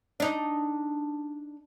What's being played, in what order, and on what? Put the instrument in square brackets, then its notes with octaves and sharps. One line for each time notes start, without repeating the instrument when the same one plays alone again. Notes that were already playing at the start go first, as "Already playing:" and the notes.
[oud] D4 D#4